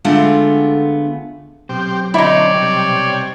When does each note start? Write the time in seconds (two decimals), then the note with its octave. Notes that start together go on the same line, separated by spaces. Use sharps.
0.05 D3 G#3 A3 B3 F4
1.69 B1 C4 G4
2.14 D3 C4 C#4 D#4 E4 C#5 D5
2.54 C3 G3